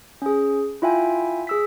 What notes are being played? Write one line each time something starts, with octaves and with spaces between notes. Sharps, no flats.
C#4 G#4
E4 F4 E5 G5 G#5
G#4 E6 B6